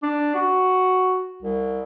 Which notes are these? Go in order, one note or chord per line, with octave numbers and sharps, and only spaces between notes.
D4
F#4
C2